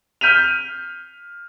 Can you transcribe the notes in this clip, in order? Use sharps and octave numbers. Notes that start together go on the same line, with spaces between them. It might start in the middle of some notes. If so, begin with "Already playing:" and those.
F6 G6 B6 D#7 F7